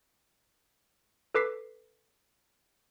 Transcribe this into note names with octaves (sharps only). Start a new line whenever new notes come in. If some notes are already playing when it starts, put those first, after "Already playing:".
A4 B4 D6 B6 C7